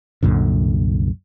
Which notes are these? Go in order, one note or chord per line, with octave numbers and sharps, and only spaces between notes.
C2 F#2 A#2 D3